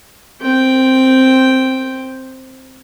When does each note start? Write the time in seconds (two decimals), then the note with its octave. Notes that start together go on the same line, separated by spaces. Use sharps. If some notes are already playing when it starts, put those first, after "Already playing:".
0.41 C4 G5